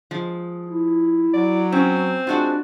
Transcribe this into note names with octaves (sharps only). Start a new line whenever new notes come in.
F3 G#3
E4
F#3 D5
C4 C#4
G#3 D4 F4 F#4 D5